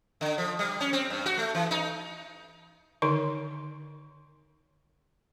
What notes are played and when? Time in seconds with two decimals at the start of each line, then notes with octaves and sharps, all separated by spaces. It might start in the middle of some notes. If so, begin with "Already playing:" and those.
0.21 D3
0.38 F3
0.59 G3
0.80 C#4
0.93 C4
1.10 G2
1.26 F#4
1.38 A3
1.55 E3
1.71 D#4
3.02 D3 D#3 D#4 A#4 C6